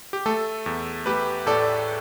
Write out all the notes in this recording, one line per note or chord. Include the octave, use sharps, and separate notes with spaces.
G4
A3 A4
E2
A3 G4 B4
A2 A4 D5